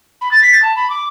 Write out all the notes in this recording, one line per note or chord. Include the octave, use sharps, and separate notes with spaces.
B5
A6
B6
A6
A5
B5
D6